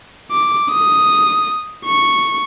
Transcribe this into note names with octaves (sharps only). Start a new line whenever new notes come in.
D6
D#6
C#6